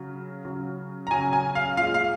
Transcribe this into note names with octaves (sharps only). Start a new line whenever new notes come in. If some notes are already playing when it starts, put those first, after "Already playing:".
Already playing: C#3 F#3
C#3 F#3
A#5
C#3 F#3 G#5
G#5
F5
A#2 G#3 F5
F5